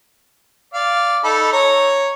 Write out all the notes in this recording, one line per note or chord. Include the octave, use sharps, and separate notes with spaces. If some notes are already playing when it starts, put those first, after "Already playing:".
D5 F5
D#4 A4 B5
C#5 A#5